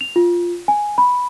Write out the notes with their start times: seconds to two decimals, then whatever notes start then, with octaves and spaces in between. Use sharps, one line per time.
0.01 F7
0.16 F4
0.68 G#5
0.98 B5